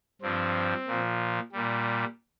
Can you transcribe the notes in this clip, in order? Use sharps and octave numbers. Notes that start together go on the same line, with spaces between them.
G2 F3 C4
A#2 F3
A#2 G3